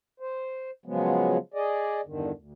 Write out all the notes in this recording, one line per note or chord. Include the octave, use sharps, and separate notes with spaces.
C5
C#3 F3 F#3 G#3 B3
G#4 D5 D#5
E2 G2 D3 D#3
D2